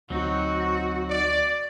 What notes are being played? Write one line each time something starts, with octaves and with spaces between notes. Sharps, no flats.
D2 F#3 C4 D#4 F#4
D5